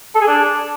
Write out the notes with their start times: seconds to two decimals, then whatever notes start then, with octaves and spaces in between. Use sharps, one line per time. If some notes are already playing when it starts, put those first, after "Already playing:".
0.15 A4
0.21 G#4
0.27 D4